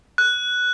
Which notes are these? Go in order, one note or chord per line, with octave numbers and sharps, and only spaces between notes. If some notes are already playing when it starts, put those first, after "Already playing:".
F#6